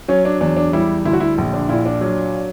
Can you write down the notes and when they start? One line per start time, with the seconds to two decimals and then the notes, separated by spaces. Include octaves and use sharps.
0.08 F#3 C#4
0.25 D4
0.41 E2 D4
0.57 D4
0.73 G3 E4
1.05 D2 E4
1.13 F#4
1.20 E4
1.38 A#1
1.53 D4
1.69 A#2 E4
1.85 D4
2.01 F#3